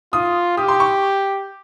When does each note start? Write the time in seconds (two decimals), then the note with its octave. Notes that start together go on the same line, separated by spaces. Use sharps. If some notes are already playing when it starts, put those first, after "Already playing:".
0.13 F4 D#6
0.57 G4 D#6
0.68 C6
0.80 C#6